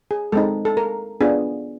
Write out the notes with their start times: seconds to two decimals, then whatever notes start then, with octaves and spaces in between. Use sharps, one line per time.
0.11 G#4
0.32 G#3 C4 D#4 A4
0.65 A4
0.77 A#4
1.21 B3 D4 F4 G#4